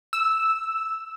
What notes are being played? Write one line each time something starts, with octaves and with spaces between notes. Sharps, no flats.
E6